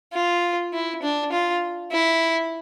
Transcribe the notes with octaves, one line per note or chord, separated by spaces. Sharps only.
F4
E4
D4
F4
E4